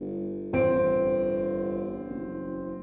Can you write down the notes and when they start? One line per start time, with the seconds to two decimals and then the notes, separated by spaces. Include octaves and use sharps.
0.01 G1
0.53 A1 C4 D7
2.10 F#1